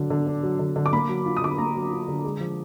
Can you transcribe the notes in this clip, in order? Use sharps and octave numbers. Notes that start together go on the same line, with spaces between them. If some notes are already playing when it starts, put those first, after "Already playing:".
Already playing: D3 F#3 D4
D3
D4
F#3
D3
D3
D6
A#3 B5
F#3
F4
D#6
D3 D6
B5
A#3 A#5
F#3
F4
D3
G#3
F3